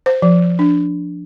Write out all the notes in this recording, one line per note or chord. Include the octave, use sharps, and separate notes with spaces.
C5
F3
D4